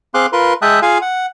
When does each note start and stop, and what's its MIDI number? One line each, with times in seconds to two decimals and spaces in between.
0.14 0.26 60
0.14 0.26 68
0.14 0.26 77
0.14 0.26 84
0.14 0.26 86
0.14 0.26 90
0.33 0.53 65
0.33 0.53 70
0.33 0.53 71
0.33 0.53 84
0.62 0.80 56
0.62 0.80 76
0.62 0.80 79
0.62 0.80 81
0.62 0.80 87
0.62 0.80 90
0.82 0.98 65
0.82 0.98 68
0.82 0.98 77
0.82 0.98 80
1.02 1.26 78